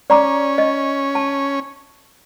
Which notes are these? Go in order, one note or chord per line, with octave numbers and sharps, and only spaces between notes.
C#4 D5 A#5 D6
D#5
A5